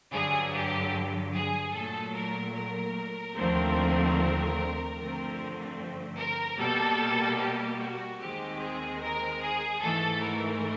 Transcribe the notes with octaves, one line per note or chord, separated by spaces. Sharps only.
G2 D3 F#3 G#4
G4
G#4
A#2 F#3 A3 A4
A#4
A#4
D#2 D3 F3 A3 C4
G2 D3 F3 A3 C4
A#4
B2 G3 A#3 A4
G4
F#4
D#2 D#3 G#3 C4 G4
G#4
A#4
G#4
G#2 E3 A3 A4
A#4